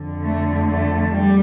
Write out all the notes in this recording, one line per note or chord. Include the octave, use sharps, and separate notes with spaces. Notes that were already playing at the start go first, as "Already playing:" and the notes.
Already playing: F2 D3
A3
A3
G3